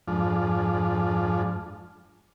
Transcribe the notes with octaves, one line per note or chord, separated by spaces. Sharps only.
F2 G#2 F3 D4